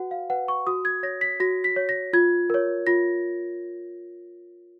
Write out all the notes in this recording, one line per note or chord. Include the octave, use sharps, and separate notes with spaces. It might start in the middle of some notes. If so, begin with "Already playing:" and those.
Already playing: F#4 B4 F#5
F5
B4 F#5
C#6
F#4 D#6
G#6
C#5 A#6
B6
F#4 A#6
B6
C#5
A#6
F4 G#6
A#4 C#5
F4 A#6